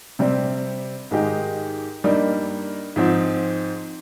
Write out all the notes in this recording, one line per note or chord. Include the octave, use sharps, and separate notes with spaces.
C3 G3 C4
G#2 D#3 G#3 D#4 G4
G2 G3 A#3 D#4
G#2 F3 C4